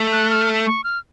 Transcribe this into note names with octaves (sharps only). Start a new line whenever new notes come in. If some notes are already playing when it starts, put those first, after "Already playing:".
Already playing: A3
F#6
F6
C#6
F6